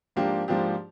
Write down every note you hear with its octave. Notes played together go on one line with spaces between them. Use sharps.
G#2 F3 A#3 D4 G4
G#2 F3 A#3 D4 G4